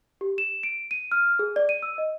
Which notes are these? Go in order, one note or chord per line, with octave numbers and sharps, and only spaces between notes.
G4
E7
D7
D#7
F6
G#4
D5
D#7
E6
D#5